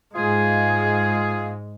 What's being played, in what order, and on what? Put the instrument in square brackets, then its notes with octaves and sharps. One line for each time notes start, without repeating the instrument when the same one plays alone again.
[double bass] G#2 G#3 [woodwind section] F4 G#4